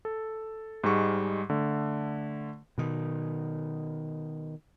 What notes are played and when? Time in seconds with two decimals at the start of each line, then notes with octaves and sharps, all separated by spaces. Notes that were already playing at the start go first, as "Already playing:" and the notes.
0.05 A4
0.84 G#2 G3 G#3 C#6
1.50 D3 A3
2.78 B2 D#3